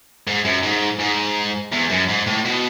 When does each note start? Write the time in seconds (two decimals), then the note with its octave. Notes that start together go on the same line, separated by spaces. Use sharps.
0.27 G#2
0.45 F#2
0.63 G#2
1.00 G#2
1.72 E2
1.90 F#2
2.09 G#2
2.27 A2
2.45 B2